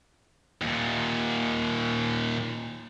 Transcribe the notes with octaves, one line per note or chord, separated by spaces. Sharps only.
D#2 A#2